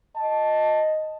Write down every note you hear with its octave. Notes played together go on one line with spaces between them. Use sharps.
D#5 A5